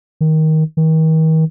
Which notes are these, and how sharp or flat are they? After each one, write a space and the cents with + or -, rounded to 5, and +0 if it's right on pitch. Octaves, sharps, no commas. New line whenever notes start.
D#3 +15
D#3 +40